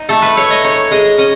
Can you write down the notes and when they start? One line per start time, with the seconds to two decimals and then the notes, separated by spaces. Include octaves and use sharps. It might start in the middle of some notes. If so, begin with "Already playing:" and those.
Already playing: D#4
0.09 A3 A4
0.22 B4
0.37 A3 C#5
0.51 D#5
0.64 D#4 C#5
0.91 G#3 D#5
1.18 C#4 D#5